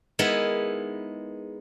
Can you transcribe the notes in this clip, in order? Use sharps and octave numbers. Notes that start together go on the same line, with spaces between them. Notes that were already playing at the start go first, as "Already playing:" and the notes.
G#3 B3 D#4 E4 A#4